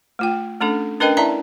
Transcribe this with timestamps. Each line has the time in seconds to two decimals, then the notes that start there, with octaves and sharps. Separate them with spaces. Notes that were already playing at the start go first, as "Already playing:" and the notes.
0.19 A3 F4 G5
0.60 A3 C#4 D4 A4
1.00 C#4 D4 A#4 B4 D#5 G5
1.17 E4 D5 E5 A5 A#5